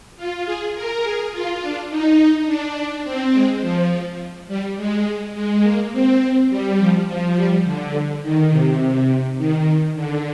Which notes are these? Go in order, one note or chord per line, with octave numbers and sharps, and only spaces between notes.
F4
G#4
A#4
G#4
F4
D4
D#4
D#4
D4
D4
C4
G#3
F3
G3
G#3
G#3
A#3
C4
G3
F3
F3
G3
D3
D#3
C3
D#3
D3